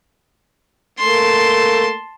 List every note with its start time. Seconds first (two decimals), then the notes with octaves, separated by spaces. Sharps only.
0.99 A3 A#3 A5 C6